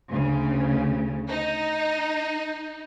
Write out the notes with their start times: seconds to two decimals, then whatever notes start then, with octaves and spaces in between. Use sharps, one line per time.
0.11 D2 C#3
1.29 D#4